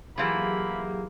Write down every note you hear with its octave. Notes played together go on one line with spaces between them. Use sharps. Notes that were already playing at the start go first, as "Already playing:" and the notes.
E3 F#3 A#3 E4 F4 G4 G#4 B5